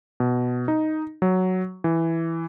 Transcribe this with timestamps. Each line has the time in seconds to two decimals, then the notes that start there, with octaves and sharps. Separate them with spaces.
0.20 B2
0.68 D#4
1.22 F#3
1.84 E3